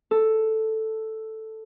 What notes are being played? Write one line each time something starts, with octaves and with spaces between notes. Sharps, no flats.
A4